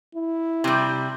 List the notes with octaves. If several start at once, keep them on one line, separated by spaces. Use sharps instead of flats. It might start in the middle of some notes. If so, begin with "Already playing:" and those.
E4
C3 G3